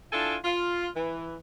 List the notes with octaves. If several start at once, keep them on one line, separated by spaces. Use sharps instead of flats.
D4 E4 F4 A4 G5 G#5
F4
E3